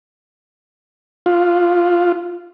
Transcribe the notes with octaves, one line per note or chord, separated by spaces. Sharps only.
F4